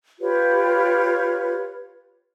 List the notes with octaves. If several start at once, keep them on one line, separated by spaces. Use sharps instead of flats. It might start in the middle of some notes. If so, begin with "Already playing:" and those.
F4 G4 B4 C#5